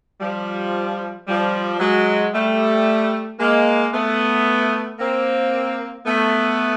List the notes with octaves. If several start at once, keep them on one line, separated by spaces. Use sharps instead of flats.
F3 G3
F3 G3
F#3 G#3
G3 A3
G#3 A#3
A3 B3
A#3 C4
A3 B3